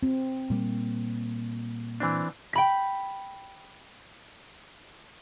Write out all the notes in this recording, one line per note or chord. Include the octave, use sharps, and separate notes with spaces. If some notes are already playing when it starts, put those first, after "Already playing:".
C4
A#2 G3 A#3
E3 C4 D4
G5 B5 B6